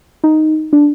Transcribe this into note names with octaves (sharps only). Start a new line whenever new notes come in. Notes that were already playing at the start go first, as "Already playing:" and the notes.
D#4
D4